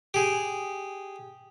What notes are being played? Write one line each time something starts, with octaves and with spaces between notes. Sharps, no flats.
G4 G#4